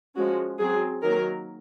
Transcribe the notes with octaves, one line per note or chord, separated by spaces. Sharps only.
F3 G#3 C#4 F#4
F#3 C4 G#4
D#3 F#3 A#3 A#4